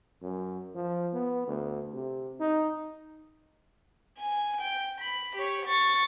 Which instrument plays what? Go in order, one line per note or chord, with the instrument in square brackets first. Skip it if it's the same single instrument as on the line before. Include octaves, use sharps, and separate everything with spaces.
[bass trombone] F#2
F3
B3
D2
C3
D#4
[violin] G#5
G5
B5
G4 C#5
C#6 A6